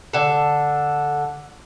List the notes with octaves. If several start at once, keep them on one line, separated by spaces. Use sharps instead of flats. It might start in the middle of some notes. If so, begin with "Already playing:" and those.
D3 A4